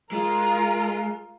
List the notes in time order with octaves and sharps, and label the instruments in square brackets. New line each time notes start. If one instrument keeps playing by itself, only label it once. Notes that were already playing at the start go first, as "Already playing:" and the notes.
[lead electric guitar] G#3 [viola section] F4 [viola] A#4